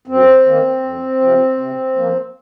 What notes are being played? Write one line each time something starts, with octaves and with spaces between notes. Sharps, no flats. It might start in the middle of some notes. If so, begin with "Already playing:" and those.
F#2 C4
D#3 A#3
F2
C3 F3
C3
F3 A#3